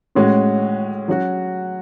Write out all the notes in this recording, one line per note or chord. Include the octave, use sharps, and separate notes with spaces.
A2 G#3 C#4 F#4
F#3 C#4 F#4